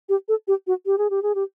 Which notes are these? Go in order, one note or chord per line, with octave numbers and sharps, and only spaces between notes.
G4
A4
G4
F#4
G4
G#4
G4
G#4
G4